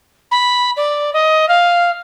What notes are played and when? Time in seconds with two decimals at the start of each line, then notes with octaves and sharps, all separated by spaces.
0.31 B5
0.76 D5
1.13 D#5
1.48 F5